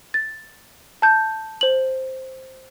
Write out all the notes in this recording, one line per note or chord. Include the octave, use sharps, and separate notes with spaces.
A6
A5 G6
C5 F#7